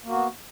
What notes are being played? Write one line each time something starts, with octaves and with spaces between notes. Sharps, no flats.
A#3 B3 F#4